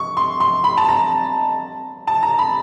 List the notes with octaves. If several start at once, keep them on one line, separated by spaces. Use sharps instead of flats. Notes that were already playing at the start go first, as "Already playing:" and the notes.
Already playing: C#6
C6
C6
B5
A5
A#5
A5
A#5
B5